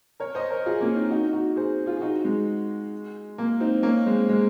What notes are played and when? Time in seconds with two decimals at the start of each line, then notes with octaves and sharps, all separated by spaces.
0.20 A#4 C#5
0.35 C5 D#5
0.50 A#4 C#5
0.66 F4 G#4
0.81 A#3 C#4
0.95 C4 D#4
1.11 D#4 F#4
1.33 D#4 F#4
1.56 G#4 C5
1.86 F4 G#4
1.96 G#4
2.01 D#4 F#4
2.25 G#3
3.38 A#3
3.60 C4 D#4
3.83 A#3 C#4
4.06 G#3 C4
4.29 G#3